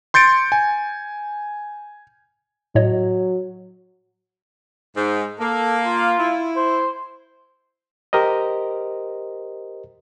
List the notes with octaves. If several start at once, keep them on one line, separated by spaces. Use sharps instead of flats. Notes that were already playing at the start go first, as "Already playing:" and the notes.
C6 G6 A6 C#7 D7
G#5
A2 F#3 C#5 D#5
G#2
A#3 A4
F4
E4
C5
G4 A#4 C5 D#5